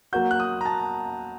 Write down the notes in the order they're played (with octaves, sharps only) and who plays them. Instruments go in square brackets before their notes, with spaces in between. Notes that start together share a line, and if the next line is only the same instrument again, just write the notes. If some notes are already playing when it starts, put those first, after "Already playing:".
[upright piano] F#3 A#3 F#4 [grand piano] G6
[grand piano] F#6
D#6
A#5
A5